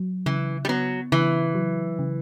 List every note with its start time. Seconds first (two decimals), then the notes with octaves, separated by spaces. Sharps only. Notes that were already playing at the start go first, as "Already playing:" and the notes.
Already playing: F#3
0.26 C#3 E3
0.65 G3
0.69 F#3 B3
1.12 C#3 E3
1.55 F#3
1.99 C#3